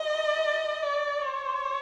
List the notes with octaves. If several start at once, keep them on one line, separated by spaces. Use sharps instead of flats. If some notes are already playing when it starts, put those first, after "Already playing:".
Already playing: D#5
D5
C#5